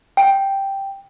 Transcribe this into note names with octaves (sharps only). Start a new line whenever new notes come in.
G5